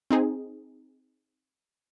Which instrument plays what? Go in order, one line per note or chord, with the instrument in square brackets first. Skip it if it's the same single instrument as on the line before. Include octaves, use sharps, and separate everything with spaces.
[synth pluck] C4 D#4 G#4